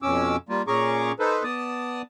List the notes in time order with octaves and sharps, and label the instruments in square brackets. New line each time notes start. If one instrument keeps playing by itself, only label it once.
[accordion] F2 B2 C#4 D6 E6
G3 A#3 F4
A#2 C#4 G#4 A#5 C#6 D6
D#4 A4 B4 C5
B3 D5 A5 D#6